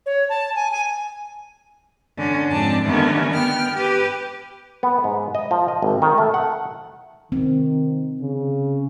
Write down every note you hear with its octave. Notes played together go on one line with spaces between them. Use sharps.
C#5
A5
G#5
G#5
D3 C#4
F2 G#2 C4 D4 A5
D3 D#3 G3 A3 B3 C#4
B3 G5 F6
G4 B4
B3
G#2
D#5
F3
D#5
G#1
D#3
A3
F#5
D#3 C4
C#3